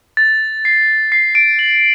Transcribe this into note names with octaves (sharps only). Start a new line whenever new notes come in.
A6
C7
C7
D7
F#7